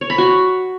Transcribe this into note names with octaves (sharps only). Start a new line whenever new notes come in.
C#5
B5
F#4